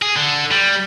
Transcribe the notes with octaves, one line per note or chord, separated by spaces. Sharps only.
G#4
D3
G3